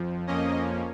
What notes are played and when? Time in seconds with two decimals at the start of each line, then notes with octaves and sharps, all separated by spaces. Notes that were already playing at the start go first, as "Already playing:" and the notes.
Already playing: F2 F3
0.27 F2 F3 A#3 C#4 D#5